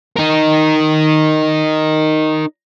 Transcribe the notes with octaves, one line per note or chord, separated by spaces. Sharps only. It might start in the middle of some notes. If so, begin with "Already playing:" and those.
D#4 A#4